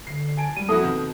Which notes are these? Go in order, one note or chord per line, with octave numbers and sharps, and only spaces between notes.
D3 C7
G#5 A5 D7
G3 G#3 D#7
F2 A#3 C4 E4 F#4 A4 A5 D#6
B2 D#3